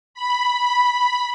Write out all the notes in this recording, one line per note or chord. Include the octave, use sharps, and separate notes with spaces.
B5